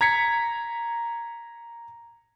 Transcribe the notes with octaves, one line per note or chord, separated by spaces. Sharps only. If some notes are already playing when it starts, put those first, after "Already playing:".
A#5 G#6 B6 C#7